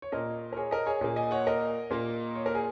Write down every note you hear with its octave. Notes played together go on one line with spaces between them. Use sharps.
C#5
A#2 A#3 A#4 D#5
A#4
G#4 C#5
A#4 D#5
G#4 C#5
A#2 A#3 G#4
D#5 G#5
C#5 F#5
A#4 D#5
A#2 A#3
C#5
A#4
G#4